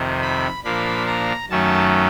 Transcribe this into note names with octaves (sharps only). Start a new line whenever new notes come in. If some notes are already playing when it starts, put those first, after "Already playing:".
Already playing: F2 C3 D#3
B5
A#2 F3 A#3 D4 B5
A#5
F#2 D#3 F#3 A3 C#4 A5